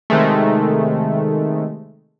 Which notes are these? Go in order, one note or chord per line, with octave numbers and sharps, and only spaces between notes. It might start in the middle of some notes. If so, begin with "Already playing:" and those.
C3 D#3 G#3 A3